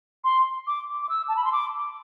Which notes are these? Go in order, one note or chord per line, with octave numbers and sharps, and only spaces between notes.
C6
D6
D6
E6
A5
B5
C6
D6